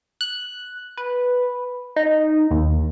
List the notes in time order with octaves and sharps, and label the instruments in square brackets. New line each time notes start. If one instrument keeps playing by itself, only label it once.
[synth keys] F#6
B4
D#4
D#2